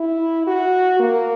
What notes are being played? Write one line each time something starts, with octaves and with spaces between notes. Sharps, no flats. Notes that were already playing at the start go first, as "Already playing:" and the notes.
Already playing: E4
F#4
A#3